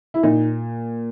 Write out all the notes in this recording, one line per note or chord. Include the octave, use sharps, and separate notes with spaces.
E4
A#2 D#4